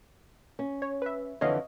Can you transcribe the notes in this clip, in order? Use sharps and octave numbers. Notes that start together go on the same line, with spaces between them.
C#4
C#5
B4 E5
F2 D3 E3 C#5 D#5 F5